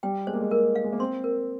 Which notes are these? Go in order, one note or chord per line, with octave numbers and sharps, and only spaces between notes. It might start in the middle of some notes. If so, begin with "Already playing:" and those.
G3 G5
G#3 C5
A#3
G#3
A#3 A#4
F5
G#3
A#3
C4 C6
A#4